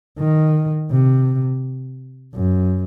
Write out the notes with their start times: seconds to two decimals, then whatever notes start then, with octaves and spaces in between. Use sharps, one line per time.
0.19 D#3
0.91 C3
2.34 F#2